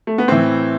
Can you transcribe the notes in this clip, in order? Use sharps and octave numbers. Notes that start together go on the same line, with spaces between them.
A3
B3
A2 E3 C4